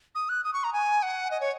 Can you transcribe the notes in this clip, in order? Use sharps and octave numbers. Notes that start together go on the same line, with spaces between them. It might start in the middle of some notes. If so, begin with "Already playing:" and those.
D#6
F#6
D#6
C#6
A#5
G#5
F#5
D#5
C#5